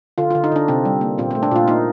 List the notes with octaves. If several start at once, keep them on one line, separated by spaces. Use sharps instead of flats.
D3 F4
D3 F4
D#4
D3 D4
C3 C4
G3
A#3
A#2 C4
A3 C4
D4
A#2 F4
A#3 D#4